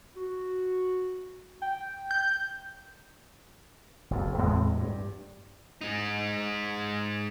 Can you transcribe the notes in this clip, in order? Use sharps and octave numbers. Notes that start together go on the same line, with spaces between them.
F#4
G5
G6
F#1 F2
E2 A2 G#3 C4
G2
G#3 D#4